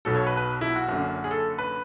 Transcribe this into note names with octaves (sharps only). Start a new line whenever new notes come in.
B1 B2 F#3 A4
C#5
B4
B4
E4
F#4
F#1 F#2 D3
G#4
A4
B4